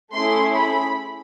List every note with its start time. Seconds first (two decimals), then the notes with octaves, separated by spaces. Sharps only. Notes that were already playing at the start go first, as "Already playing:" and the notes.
0.13 A3 C#4 E4 G#4 C6
0.54 B5